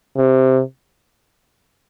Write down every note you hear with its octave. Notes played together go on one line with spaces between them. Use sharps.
C3